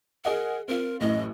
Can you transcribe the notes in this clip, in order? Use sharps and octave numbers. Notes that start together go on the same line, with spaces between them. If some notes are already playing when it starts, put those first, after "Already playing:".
G#4 A#4 D#5 F#5
C4 F4 A#4
A1 F#2 A2 D#5